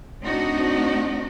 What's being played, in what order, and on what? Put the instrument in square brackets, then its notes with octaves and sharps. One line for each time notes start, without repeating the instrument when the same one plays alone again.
[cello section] A2 C4 D4 D#4 F#4 D#5